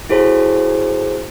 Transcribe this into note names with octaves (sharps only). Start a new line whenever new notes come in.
E4 F#4 G#4 A4 C5 C#5